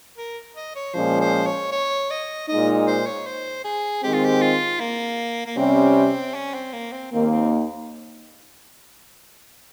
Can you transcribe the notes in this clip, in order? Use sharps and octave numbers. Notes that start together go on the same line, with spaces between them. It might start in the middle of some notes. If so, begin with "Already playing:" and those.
A#4
D#5
C#5
A#2 F3 G#3 C#4 C5
C5
C#5
C#5
D#5
A#2 G#3 D#4 D#5
C5
C#5
C5
G#4
D#3 G#3 C4 G4
F4
G4
F4
A#3
A#3
C3 G3 C4 C#4
C#4
C4
A#3
C4
D#2 D#3 A#3 C4
C4